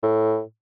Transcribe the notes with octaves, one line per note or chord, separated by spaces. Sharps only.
A2